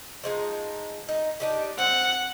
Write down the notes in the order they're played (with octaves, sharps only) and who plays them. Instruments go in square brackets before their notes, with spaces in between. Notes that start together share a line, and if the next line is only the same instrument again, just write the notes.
[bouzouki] F3 G#3 D#4
D#4
D4 D#4 G4
[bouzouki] C4 [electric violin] F#5